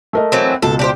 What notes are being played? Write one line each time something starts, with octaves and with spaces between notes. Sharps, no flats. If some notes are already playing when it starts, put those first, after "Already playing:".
A3 A#4 D#5
E3 F#3 C4
C#2 B2 A4
D4 G4 C5